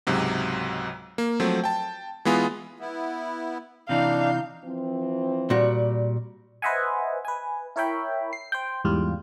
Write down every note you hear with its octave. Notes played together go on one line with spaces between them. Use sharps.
C#2 G#2 C3 F#3
A#3
F3 F#3 A3 C4
G5 A5
E3 G#3 B3 F4 G#4
B3 E4
C3 E3 D4 D#4 F5 G6
E3 F3 C4
A#2 G3 F#4
B4 C5 D#5 E5 F#5 G#5
B4 G#5
E4 A#4 C#5 E5 G5 B5
C7
C5 G5
E2 G#2 G3 F4